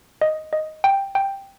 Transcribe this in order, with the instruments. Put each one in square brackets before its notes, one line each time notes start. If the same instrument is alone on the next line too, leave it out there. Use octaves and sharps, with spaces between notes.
[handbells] D#5
D#5
G5
G5